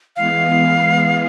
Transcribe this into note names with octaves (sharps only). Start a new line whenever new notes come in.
E3 G#3 B3 F5